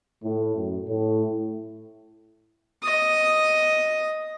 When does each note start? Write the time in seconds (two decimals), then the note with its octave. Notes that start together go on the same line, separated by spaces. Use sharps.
0.24 A2
0.56 F#2
0.87 A2
2.82 D#5 D#6